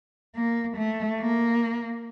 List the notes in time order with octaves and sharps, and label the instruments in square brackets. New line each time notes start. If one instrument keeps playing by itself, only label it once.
[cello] A#3
A3
A#3